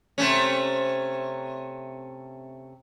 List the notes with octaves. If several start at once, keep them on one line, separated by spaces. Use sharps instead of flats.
C3 A3 C#4